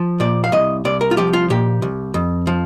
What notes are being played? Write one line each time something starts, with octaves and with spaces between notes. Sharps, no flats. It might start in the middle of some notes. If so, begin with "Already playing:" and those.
Already playing: F3
A#2 D5
F5
C2 D#5
C2 D5
A#4
F4
F3 G4
F4
A#2 G4
C2
F2
F3